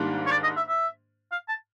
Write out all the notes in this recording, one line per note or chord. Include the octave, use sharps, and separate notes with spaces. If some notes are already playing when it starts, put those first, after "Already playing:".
Already playing: G#2 D#3 G3 A#3 D4
C#5
D5
D#5
E5
E5
F5
A5